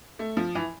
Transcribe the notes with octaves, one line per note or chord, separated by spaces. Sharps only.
A3
F3
E3